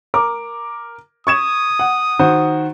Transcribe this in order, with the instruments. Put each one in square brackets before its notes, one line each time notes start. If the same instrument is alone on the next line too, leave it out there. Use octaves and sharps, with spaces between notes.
[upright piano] A#4 D6
[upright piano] C#6 G#6 E7 [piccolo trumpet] D#6
[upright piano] F#5
D#3 F#4 C5